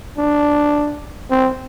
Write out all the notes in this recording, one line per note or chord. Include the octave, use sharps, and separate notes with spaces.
D4
C4